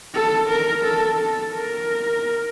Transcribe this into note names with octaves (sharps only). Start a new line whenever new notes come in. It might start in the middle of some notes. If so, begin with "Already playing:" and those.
A4
A#4
A4
A4
A#4